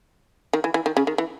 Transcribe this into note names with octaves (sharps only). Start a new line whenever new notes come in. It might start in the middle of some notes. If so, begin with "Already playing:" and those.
D#3
E3
E3
D#3
C#3
D#3
E3